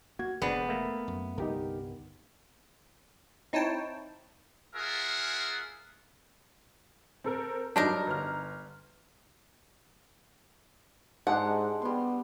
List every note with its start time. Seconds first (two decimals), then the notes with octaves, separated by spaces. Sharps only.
0.19 A#3 F#4 G#6
0.42 E1 B3 C4 D4 G#4
0.69 A3 A#3 A#4
1.08 F#2
1.38 C2 G2 D3 D#4 G4 A#4
3.53 C4 D#4 E4 C#5 G5 A5
4.75 F4 G#4 A#4 E5 F#5
7.24 C4 A4 A#4
7.76 G2 F#3 D4 D#4 A#4
8.07 G1 F6
11.27 G#2 G#3 D4 G4 F#5
11.82 G3 B3 C6